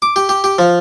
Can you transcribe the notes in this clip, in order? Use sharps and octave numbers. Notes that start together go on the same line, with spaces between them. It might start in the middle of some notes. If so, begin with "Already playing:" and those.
D6
G4
G4
G4
F3